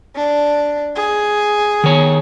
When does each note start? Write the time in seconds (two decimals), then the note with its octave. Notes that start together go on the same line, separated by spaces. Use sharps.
0.16 D4
0.96 G#4
1.84 D#3 C#5